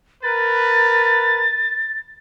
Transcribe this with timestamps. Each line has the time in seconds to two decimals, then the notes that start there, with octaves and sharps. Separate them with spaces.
0.23 A#4 B4 A6